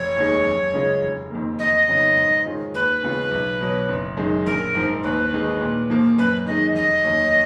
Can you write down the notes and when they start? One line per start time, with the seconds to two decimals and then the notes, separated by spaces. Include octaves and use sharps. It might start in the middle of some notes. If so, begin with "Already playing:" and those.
Already playing: F1 C#5
0.16 D#2 D#3 G#3
0.44 F#2
0.73 C#3 G#3 C#4 F4
1.02 F1
1.30 F2 D#3 A#3
1.59 F2 D#5
1.88 C#3 F#3 B3 D#4
2.16 G#2
2.45 D#3 G#3 C#4 F4
2.74 D#2 B4
3.03 C#3 G#3 B3 F4
3.31 B1
3.61 B2 F#3
3.88 F#1
4.17 F#2 D#3 G#3
4.46 A#1 A#4
4.75 G#2 F3
5.03 D#2 B4
5.33 D#3 G#3 D#4
5.61 A#2
5.90 F3 A#3
6.18 F#2 B4
6.46 D#3 G#3 D#4 D#5
6.75 F1 D#5
7.04 D#2 D#3 F#3 C#4